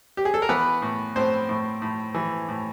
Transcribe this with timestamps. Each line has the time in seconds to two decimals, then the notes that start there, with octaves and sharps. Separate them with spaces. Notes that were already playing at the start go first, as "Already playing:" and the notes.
0.17 G4
0.25 G#4
0.34 A4
0.42 A#4
0.49 E3 B3 B4
0.82 A2
1.16 A2 C4 C5
1.49 A2
1.82 A2
2.15 E3
2.48 A2